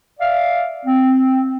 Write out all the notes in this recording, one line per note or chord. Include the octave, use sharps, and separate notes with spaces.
D5 E5 F5
C4